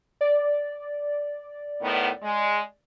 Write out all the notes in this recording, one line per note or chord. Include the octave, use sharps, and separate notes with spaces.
D5
A2 D#3 B3
G#3